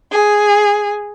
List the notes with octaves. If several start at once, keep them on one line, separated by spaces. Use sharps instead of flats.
G#4